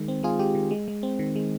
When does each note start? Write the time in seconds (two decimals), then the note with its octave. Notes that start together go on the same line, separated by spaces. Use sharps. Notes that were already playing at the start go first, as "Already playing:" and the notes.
Already playing: D#3 G#3
0.08 C4
0.23 G#3 F4 G#4
0.39 G#3 G4
0.55 D#3
0.71 G#3
0.88 G#3
1.03 C4
1.19 D#3
1.36 G#3